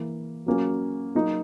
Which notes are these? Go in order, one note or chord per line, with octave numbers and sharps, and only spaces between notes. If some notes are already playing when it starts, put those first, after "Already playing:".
Already playing: E3 A#3 E4
F#3 A#3 C#4 F#4
F#3 A#3 D#4 F#4